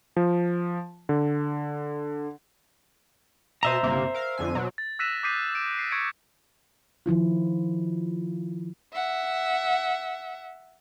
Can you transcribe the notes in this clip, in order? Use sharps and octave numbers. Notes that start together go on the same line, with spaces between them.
F3
D3
B2 C5 D#5 E5 A5 A#5
G1 C3 A#3
A#4 F5
F2 D3 G#5
B2 F#3
A6
E6 F#6 A#6 B6 D#7 E7
D6 D#6 G6 B6 C7 D#7
D7 E7
C7
C#6 G#6 C#7 D7
D#3 F3 E4 F4
E5 F#5